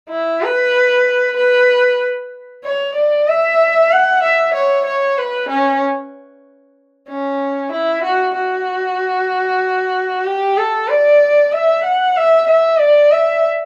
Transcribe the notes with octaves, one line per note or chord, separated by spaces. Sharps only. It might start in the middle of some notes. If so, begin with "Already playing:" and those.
E4
B4
B4
C#5
D5
E5
F#5
E5
C#5
C#5
B4
C#4
C#4
E4
F#4
F#4
G4
A4
D5
E5
F#5
E5
E5
D5
E5